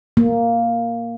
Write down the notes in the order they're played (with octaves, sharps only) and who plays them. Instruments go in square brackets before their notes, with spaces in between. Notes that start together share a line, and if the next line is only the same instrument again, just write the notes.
[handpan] A#3